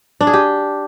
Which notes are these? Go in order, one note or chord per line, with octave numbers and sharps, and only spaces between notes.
D4
G#4
G4